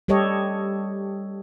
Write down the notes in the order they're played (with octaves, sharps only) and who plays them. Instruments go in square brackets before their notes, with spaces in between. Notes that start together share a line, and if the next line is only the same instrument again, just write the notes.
[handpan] G3 G4 A4 C#5 D#5